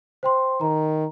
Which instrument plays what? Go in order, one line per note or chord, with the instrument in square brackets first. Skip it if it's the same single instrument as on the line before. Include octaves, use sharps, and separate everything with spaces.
[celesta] C5 G5 C6
[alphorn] D#3 [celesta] A#5